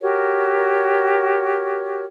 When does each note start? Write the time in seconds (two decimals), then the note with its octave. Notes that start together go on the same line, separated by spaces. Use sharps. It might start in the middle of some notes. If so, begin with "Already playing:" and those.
0.01 F#4 G4 A#4 C#5